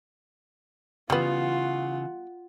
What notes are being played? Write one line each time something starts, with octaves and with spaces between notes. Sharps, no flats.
C#3 E3 G3 B3 F4 F#5